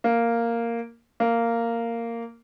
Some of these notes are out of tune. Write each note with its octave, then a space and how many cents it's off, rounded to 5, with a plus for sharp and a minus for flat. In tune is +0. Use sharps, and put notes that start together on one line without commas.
A#3 -5
A#3 -10